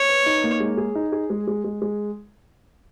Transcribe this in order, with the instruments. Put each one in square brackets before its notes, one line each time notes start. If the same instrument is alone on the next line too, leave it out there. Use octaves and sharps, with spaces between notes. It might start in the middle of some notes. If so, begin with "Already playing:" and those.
Already playing: [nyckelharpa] C#5
[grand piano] B4
D#4
A#3
G#3
G#4
D#4
G#4
G#3
G#3
G#3
G#3